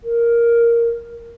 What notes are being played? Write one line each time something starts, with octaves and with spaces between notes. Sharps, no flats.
A#4